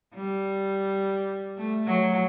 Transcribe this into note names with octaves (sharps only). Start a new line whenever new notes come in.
G3
A3
F#3